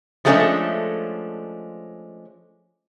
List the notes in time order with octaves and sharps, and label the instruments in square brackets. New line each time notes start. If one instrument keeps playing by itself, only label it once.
[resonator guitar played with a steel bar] F3 G#3 A3 B3 C#4 D4